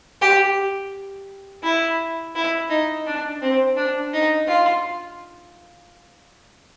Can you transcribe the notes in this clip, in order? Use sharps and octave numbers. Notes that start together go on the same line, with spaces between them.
G4
E4
E4
D#4
D4
C4
D4
D#4
F4